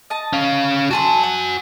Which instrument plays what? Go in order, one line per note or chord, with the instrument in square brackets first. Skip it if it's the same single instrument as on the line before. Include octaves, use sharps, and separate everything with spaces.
[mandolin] D#5 A5
[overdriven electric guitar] C#4 F5
[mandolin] D4 A4 C6 [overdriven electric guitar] F#4 G#5
[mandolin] F#5